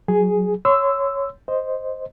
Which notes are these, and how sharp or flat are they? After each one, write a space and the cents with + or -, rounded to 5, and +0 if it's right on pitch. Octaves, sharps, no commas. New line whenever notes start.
F#3 +0 G#4 +0
C#5 +0 C6 -30 E6 +0
C5 +0 D#5 +0